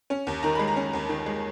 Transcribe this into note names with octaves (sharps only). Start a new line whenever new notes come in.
C#4
D#2
D#3 A#5
G#3 B5
A#5
C#4
D#2
D#3
G#3